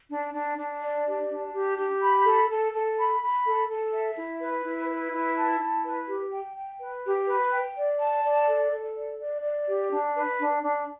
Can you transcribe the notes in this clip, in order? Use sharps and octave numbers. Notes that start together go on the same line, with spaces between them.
D4
D4
D4
D5
G4
D4
G4
G4
B5
A4
A4
A4
B5
B5
A4
A4
E5
E4
B4
E4
B4
E4
A5
E4
B4
G4
G5
G5
B4
G4
B4
G5
D5
A5
D5
A4
A4
D5
D5
D5
G4
D4
B4
D4
D4